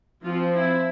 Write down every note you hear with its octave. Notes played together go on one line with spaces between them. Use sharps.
F3 C4 F4
E4